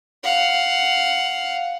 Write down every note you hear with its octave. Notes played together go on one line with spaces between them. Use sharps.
F5 F#5